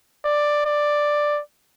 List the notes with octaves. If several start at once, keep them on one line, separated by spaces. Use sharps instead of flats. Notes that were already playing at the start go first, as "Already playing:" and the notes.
D5
D5